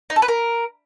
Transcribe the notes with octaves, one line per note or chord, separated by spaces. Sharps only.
D#4
A4
B4
A#4